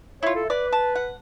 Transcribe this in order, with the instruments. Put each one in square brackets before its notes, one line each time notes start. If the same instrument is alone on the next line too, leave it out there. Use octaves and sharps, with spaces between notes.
[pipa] E4 F4 [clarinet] C#5
[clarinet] A4
[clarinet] B4 [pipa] D5
[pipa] A5
F#5